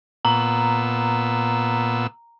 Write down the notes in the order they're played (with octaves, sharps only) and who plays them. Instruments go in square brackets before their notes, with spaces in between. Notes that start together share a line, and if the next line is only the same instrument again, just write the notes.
[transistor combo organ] A#2 B3 E6 [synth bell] A#5